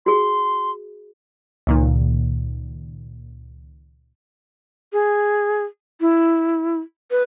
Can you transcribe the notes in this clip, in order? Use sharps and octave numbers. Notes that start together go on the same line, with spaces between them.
F#4 G#4 C6
C#2 A#2 D#3
G#4
E4
B4